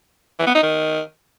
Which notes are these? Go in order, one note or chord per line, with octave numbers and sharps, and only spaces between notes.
E3
B3
D#4
D#3